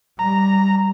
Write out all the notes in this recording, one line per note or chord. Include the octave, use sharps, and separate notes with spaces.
G3 A#5